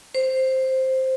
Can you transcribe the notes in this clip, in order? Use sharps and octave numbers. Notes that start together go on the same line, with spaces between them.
C5